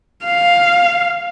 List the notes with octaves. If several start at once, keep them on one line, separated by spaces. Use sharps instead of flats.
F5